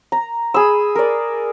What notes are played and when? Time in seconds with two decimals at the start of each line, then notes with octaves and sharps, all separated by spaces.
0.12 A#5
0.54 G#4 B5 E6
0.95 A#4 D5